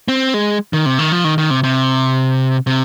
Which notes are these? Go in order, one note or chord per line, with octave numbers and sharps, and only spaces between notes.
C4
G#3
D#3
C3
D#3
F3
D#3
D#3
C3
C3
C3